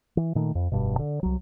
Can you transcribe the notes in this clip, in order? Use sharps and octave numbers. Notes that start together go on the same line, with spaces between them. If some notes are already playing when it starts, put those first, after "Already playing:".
E3
A#2 D#3 A3
F2
F1 G2 B2
D3
C2 F#3